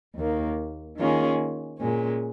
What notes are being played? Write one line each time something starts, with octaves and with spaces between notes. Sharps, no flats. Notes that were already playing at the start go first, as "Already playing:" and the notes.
D#2 D#3 A#3
D#3 A#3 C#4 F4 G#4
A#2 G#3 C#4